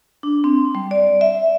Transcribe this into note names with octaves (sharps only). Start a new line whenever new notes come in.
D4
C4
G3
D5
E5